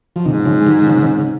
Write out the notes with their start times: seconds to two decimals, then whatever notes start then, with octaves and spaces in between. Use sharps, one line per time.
0.16 F3
0.25 G#2 C3 D#3
0.45 C#3 F3
0.61 G#3
0.67 D#3 G3
0.82 D#3
0.87 C#3 F3
0.97 C#3
1.02 C3 D#3
1.17 C#3